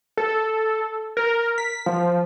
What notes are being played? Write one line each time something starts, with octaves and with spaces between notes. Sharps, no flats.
A4
A#4
B6
F3